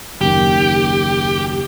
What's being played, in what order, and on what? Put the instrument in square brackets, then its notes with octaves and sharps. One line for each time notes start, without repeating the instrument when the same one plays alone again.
[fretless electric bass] F#1 D#2 [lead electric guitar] G4